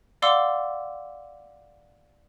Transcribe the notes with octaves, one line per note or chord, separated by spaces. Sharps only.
D5 F5 F#5 C6 D6 E6